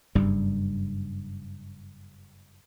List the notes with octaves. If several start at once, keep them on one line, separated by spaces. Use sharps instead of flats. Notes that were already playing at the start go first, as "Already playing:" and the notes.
F#1 G2 G3